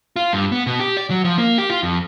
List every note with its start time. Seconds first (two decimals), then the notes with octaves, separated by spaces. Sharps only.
0.16 F4
0.33 G2
0.52 B3
0.67 B2
0.80 G4
0.97 D5
1.10 F#3
1.24 F3
1.38 A#3
1.58 G4
1.70 F4
1.83 F2